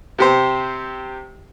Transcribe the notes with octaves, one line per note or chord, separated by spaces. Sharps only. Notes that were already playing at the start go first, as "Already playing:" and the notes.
C3 G4 C5